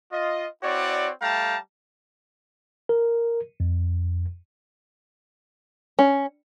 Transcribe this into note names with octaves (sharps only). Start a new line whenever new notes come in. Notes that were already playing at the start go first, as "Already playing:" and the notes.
F4 D#5
C4 E4 F#4 C#5 D5
G3 A3 F5 G5 A5 A#5
A#4
F2
C#4